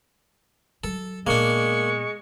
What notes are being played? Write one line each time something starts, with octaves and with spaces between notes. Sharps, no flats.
F#3 A4
A#2 G#3 A#3 B3 D4 C#6